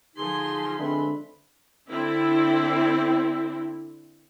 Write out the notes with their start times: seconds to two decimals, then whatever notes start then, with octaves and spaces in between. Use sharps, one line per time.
0.16 D3 F3 D#4 G#4 C6
0.79 D3 G#3 C4 B4 E5 B5
1.90 D3 C4 E4